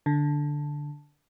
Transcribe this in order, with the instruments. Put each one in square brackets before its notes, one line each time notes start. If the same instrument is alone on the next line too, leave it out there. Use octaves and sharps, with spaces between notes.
[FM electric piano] D3